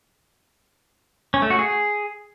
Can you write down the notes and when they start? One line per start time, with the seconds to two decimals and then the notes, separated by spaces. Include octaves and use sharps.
1.34 C#4
1.42 A3
1.50 F#4
1.59 G#4